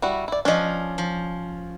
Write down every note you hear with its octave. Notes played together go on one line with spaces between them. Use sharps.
G3 E4 F#4
E4 D5
F3 C#4 D4 D#5
F3